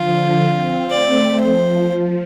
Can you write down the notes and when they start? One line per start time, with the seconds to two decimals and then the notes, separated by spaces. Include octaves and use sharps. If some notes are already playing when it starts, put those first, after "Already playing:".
Already playing: D3 F3 F4
0.41 C4
0.90 A3 D5
1.40 F3 C5